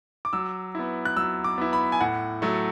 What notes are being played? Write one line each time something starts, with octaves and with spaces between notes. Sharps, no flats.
D6
F#3 E6
B3 E4
F#6
F#3 E6
D6
B3 E4
B5
G#5
A2 F#5
F#3 A3